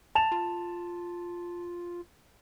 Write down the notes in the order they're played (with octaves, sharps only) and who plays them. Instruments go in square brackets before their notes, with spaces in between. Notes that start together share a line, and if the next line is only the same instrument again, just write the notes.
[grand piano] A5 E7 F7
[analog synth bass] F4